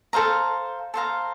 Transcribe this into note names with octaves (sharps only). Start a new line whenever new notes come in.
A4 C5 F5 A#5
A4 C5 F5 A#5